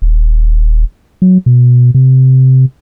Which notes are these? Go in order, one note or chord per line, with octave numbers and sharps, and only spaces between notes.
D#1
F#3
B2
C3